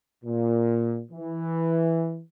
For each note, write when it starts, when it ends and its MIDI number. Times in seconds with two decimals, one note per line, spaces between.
0.25 1.00 46
1.11 2.21 52